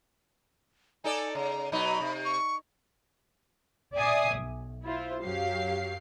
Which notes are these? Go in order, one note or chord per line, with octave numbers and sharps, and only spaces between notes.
D#4 A4 D5 G#5
C#3 A#5
B2 F#3 D#4 B5
C3
C#6
D5 E5 G#5 D6 D#6 C7
B1
E4 F4 C5
F#2 F#3 G4 F5 C7